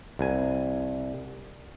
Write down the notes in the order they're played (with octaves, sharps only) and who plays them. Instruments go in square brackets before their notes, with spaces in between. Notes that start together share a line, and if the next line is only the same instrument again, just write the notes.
[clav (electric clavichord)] C2 G#5